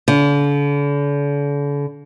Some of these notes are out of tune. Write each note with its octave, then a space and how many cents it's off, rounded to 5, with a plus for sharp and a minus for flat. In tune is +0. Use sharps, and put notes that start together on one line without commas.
D3 -40